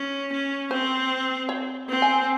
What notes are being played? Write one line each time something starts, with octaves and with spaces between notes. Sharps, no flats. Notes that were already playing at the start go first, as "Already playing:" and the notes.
Already playing: C#4
C#4
C4 C5
C#5
C4
G#5